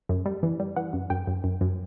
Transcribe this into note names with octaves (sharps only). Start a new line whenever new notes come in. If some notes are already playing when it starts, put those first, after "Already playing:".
F#2
G3
E3
G3
E3 F#5
F#2
F#2 G5
F#2
F#2
F#2